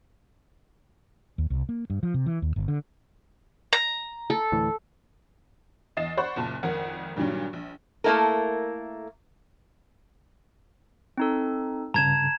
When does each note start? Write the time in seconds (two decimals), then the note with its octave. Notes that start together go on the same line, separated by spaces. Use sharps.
1.38 D#2
1.50 C2
1.69 A#3
1.90 G2
2.03 F3
2.14 C3
2.26 E3
2.42 D#2
2.56 G1
2.68 D3
3.73 A#5
4.30 A4
4.52 D2 A2 E3
5.97 E2 D#5 A6 C7 E7
6.17 C5 D5 F#5 B5 C#6 F#6
6.36 F#1 A#2 A5
6.63 G#1 F2 A#4 F#5
7.16 G2 A#2 D#3 F#3 G3
7.53 A#1
8.04 A3 A#3 C4 E4 A4 A#4
11.17 C4 D#4 A4
11.94 G2 C#3 A5 A#5 G#6 E7